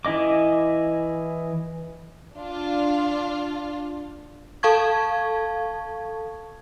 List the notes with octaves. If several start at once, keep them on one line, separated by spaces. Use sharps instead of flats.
E3 E4 G#4 D#5 D6
D4 F4
A4 F5 A5 C#6 G#6